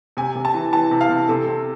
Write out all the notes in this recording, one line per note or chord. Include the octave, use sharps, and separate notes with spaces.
C3 G#5
C3
A5
E3
E3 A5
C3
F5
C3
C3 A4
C3